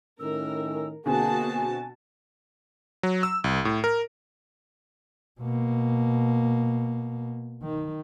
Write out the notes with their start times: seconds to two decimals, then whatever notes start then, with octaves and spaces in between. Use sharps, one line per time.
0.19 A2 D#3 C#4 A#4 E6
1.06 B2 D3 A#3 C4 F#4 G#4 G#5 A5
3.03 F#3
3.23 E6
3.44 C2
3.65 A2
3.84 A#4
5.41 B2 A#3
7.63 D#3